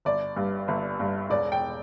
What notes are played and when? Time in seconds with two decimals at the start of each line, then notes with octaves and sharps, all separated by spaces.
0.05 G1 D5
0.36 G2
0.68 G1
1.00 G2
1.30 E1 D5
1.52 G5